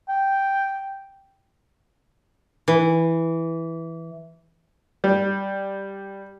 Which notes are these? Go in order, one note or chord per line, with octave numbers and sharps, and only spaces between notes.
G5
E3
G3